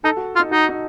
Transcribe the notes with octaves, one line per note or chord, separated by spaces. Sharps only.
D#4 A4
F#4
F4
D#4
D#4 F#4
D#4